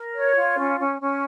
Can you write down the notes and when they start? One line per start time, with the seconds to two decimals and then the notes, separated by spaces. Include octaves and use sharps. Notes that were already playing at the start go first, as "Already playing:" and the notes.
Already playing: A#4
0.13 C#5
0.36 F4
0.57 C#4
0.78 C#4
0.99 C#4